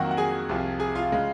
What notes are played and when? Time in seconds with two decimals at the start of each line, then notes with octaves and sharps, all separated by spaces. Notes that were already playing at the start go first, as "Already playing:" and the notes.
Already playing: F2 D#3 F#3 A#3 F#4 F#5
0.11 F#5
0.17 G#4 G#5
0.49 C2 C3 F3
0.80 G#4 G#5
0.95 F4 F5
1.12 C#3 G#3